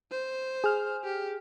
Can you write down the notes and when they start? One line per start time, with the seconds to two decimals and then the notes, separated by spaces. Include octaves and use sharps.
0.11 C5
0.64 G#4 F6
1.04 G4